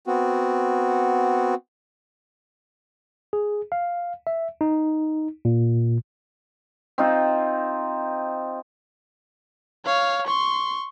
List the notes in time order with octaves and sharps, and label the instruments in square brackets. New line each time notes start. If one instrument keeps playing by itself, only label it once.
[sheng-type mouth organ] B3 C4 F#4
[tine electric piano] G#4
F5
E5
D#4
A#2
[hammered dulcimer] C4 D#4 F4
[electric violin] C#5 F5
C6 C#6